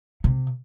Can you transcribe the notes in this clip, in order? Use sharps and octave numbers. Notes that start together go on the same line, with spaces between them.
C3